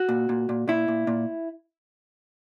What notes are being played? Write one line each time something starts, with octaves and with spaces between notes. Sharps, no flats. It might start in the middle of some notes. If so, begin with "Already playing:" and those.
Already playing: F#4
A#2
A#2
A#2
A#2 E4
A#2
A#2